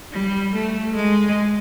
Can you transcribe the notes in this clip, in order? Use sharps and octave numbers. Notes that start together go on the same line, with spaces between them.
G3
A3
G#3